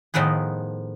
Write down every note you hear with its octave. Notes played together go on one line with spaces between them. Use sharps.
A2 D#3 F3 B3 G#4